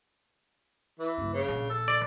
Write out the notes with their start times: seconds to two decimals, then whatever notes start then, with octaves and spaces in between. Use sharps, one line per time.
0.99 E3
1.18 F#1 G2
1.34 C#3
1.48 A#1
1.70 A4
1.88 D5